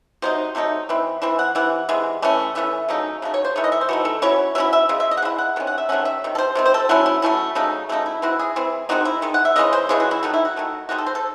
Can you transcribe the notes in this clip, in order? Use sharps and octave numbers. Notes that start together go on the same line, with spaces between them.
C3 F#3 D#4 C5
C3 F#3 A3 D#4
E3 C4 E4
E3 C4 E4 E5
F#5
C3 E3 F#5
C3 E3 G#3
E3 A3 C#4
E3 A3 C#4 E5
C#3 F#3 A3 D#4
C#3 F#3 A3 D#4
C#5
C5
E3 A3 D#4 C#5
D#5
E5
C5
E3 A3 D#4 F#4
A4
F#3 C#4 E4 C#5
F#3 C#4 E4 E5
E5
C#3 G#3
E5
D#5
F#5
C#3 G#3 E4
F#5
C3 D#3 C#4
F#5
E5
C3 D#3 A3 C#4 F#5
E5
C3 D#3
A4
C5
C3 D#3 C4
C5
A4
F#3 A3 C#4 E4 F#4
E4
F#3 A3 C#4 E4
C#3 F#3 A3 D#4
C#3 F#3 A3 D#4 E4
E4
E3 C4 E4 F#4
G#4
E3 C4 E4
D#3 G#3 C4 D#4 F#4
E4
D#3 G#3
F#5
E5
C#3 E3 G#3 C#4 D#5
C5
C#3 E3 G#3 C#4 G#4
F#4
E4
D#3 A3 D#4 F#4
E4
F#4
D#3 A3 D#4
D#3 G#3 D#4 F#4
A4
C5
A4